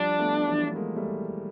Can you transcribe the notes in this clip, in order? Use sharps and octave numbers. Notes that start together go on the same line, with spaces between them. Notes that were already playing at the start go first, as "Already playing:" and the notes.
Already playing: F3 G3 D4
A3 B3
E3 F#3
A3
G#3 A#3
G3 A3